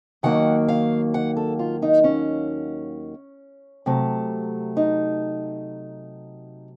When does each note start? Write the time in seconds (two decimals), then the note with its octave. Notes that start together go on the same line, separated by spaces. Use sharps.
0.23 D#2 D#3 F#3 A#3 F#5
0.68 F5
1.14 F#5
1.37 A4
1.59 F4
1.82 D#4
2.04 C#4
3.86 C3 F#3 A3
4.77 D#4